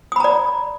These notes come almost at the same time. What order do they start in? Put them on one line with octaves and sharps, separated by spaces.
D#6 B5 A#5 D5